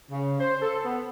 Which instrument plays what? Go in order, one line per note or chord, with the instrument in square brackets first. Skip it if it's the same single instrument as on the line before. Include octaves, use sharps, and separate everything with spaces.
[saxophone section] C#3
C5
A4
B3